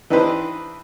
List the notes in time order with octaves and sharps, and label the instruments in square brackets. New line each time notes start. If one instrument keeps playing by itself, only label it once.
[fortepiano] E3 D4 D#4 G4 B4 C5